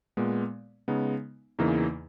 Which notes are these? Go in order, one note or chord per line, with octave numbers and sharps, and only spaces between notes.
A#2 G#3 B3
C#3 G#3 B3 D#4
E2 C#3 E3 A#3 D#4